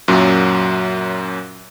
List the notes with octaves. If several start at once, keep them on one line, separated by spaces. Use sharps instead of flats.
F#2 A#2 F#3